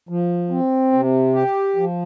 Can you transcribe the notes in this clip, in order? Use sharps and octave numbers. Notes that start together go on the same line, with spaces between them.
F3
C4
C3
G4
F3